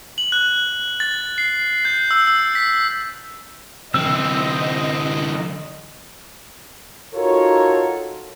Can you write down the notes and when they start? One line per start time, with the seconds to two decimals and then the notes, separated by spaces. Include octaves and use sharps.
0.18 F#7
0.32 F#6
1.00 A6
1.38 C7
1.85 G6
2.11 E6
2.27 E6
2.55 B6
3.94 D3 E3 C4 D#5 E6
7.14 D#4 F4 F#4 A4 A#4 C#5